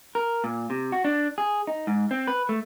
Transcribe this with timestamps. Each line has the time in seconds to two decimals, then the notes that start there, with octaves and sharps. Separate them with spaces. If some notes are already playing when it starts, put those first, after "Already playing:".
0.15 A#4
0.44 A#2
0.70 C3
0.92 F#4
1.05 D4
1.38 G#4
1.67 D#4
1.87 G#2
2.11 C4
2.28 B4
2.49 A3